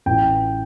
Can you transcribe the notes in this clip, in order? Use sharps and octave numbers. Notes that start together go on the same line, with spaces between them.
A1 A2 E3 G5